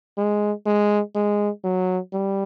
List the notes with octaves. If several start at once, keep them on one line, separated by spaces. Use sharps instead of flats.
G#3
G#3
G#3
F#3
G3